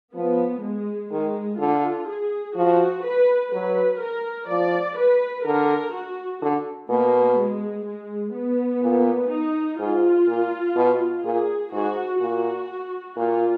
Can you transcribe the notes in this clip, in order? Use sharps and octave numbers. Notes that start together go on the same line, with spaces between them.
F3 B3
G#3
D#3 G#3
D3 F4
G#4
F3 F#4
B4
F#3 B4
A#4
F3 D5
B4
D3 A#4
F#4
D3
B2 A#3
G#3
G#3
B3
A#2
D#4
G#2 F4
A#2
B2
A#2 G#4
G#2 F#4
A#2 F#4
A#2 F4